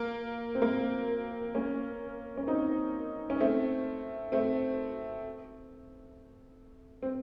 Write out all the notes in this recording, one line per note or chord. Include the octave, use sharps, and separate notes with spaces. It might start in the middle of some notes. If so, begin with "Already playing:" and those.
Already playing: A#3
C4
A#3
A#3 C#4
C#4
C4 D#4
C#4
A3 C4
A3 C4
C4